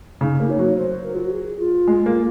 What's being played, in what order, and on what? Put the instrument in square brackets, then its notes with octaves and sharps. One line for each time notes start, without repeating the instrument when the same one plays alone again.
[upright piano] C#3 [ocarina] D#4
[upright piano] A#3
[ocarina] C#5
[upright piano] F#3
[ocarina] C5
A#4
F4
F#4
G#4
F4
[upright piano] G#3
A#3